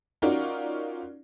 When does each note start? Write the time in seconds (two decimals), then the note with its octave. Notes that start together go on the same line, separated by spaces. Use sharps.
0.22 C#4 D#4 F4 F#4 A#4 D5